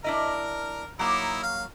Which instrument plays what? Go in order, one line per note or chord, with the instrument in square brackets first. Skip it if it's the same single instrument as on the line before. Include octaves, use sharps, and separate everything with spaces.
[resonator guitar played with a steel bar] D4 E4 D#5 [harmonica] A#4 F6
[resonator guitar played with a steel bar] F#3 A#3 C#5 [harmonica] D#4 E4
[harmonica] F5